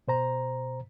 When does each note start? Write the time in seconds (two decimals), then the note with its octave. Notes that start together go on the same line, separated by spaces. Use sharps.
0.08 B2 C5 A#5